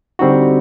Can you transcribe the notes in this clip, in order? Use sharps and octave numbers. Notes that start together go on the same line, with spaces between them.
D3 G3 C4 D#4 F#4